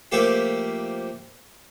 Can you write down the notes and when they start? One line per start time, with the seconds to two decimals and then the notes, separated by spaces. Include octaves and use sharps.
0.12 F3 A3 A#3 G4 A4 E5